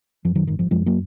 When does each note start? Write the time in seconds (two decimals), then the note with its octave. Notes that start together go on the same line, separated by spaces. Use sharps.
0.25 F#2 F3
0.35 D#3 F#3
0.47 G#1 D#3
0.59 F3
0.71 F#2 F3 G#3
0.86 F#3 A#3